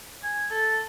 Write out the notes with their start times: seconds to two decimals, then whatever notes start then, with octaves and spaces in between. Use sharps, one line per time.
0.24 G#5
0.51 A4